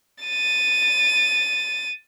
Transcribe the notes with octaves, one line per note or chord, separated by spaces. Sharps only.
A6 D#7